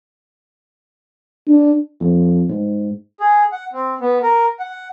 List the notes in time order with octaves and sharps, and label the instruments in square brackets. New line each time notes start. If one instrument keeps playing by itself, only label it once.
[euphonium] D4
[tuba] F2
G#2
[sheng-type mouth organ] G#4
F#5
C4
B3
A#4
F#5